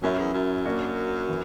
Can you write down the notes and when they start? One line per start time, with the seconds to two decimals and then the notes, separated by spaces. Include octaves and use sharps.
0.02 F#2 F#3 C#4 E4 A#4 E5
0.18 E2
0.33 F#2
0.65 A#3 D4 F#4
1.29 E3